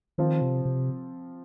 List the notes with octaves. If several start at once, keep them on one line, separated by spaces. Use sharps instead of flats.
D#3 F3 C4 F4
C3
C3